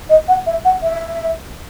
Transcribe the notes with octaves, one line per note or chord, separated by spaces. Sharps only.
D#5
F#5
E5
F#5
E5